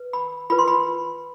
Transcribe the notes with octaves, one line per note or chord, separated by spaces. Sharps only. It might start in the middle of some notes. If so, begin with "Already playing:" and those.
Already playing: B4
B5
F4 B4 B5
C6
B5